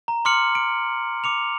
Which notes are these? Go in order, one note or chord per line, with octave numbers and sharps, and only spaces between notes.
A#5
C6 D6 F6 C#7 F#7
D7
D6 C#7 F7